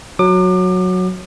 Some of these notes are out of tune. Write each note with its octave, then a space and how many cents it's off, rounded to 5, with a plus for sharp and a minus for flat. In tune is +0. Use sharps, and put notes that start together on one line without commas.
F#3 -10 D6 +35